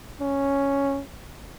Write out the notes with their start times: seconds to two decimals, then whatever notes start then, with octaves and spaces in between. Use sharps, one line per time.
0.21 C#4